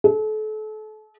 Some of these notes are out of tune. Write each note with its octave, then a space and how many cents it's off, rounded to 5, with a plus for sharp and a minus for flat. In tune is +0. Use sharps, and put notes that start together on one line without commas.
A4 -35